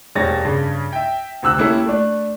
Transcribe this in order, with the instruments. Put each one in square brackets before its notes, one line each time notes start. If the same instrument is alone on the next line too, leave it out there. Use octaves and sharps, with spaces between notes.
[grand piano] E1 G3 C4 C#5 A6 A#6
G2 C#3
E5 G5
D2 C3 E6 F#6
A#3 C#4 E4 G4 A4 E5
A3 D4